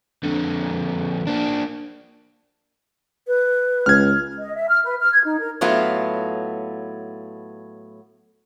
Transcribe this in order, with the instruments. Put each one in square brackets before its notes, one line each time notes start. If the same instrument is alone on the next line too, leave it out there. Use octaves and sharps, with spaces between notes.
[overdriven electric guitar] F2 D3
A#3 D4
[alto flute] B4
[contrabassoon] C#2 [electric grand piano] F6 G#6
[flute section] D#5
E5
F6
B4
F6
G#6
D#4
A#4
[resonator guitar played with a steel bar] A2 F#3 A3 B3 F4